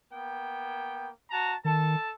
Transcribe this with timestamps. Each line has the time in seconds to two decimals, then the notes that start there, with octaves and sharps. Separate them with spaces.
0.13 A#3 B3 G5
1.31 F#4 A5 A#5
1.65 D#3 A4 A5